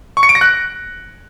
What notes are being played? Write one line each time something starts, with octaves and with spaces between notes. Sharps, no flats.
C#6
C#7
D7
A#6
F#6